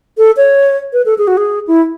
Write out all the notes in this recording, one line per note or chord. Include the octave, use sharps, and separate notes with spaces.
A4
C#5
B4
A4
G#4
F#4
G#4
E4